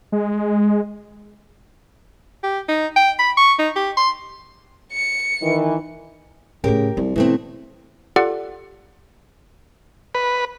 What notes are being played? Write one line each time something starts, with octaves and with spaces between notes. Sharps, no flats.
G#3
G4
D#4
G5
B5
C#6
D#4
G4
C6
C#7
D#3 E3
A2 C#3 A3 G4 A#4
C2 F3
B2 E3 A3 A#3 C4
F4 G4 A4 D5 F#5
B4